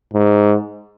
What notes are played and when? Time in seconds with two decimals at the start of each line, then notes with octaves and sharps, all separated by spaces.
0.14 G#2